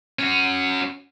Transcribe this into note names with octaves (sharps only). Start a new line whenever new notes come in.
C#4 F#4